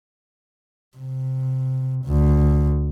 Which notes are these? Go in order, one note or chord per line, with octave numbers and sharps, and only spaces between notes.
C3
D2